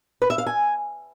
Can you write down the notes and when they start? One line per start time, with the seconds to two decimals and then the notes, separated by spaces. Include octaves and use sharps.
0.22 B4
0.30 E5
0.38 F5
0.46 G#5